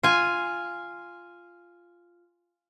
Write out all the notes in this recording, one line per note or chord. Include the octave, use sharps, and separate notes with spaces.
F4 G#5